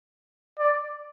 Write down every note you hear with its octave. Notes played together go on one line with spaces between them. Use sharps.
D5